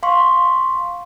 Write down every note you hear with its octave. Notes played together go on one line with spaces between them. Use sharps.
F5 C6 C#6